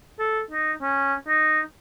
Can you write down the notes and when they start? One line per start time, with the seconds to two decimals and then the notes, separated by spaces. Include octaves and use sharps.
0.19 A4
0.50 D#4
0.81 C#4
1.28 D#4